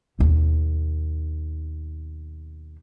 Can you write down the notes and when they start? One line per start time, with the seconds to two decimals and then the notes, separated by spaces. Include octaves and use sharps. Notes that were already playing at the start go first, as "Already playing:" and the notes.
0.19 D#2 B2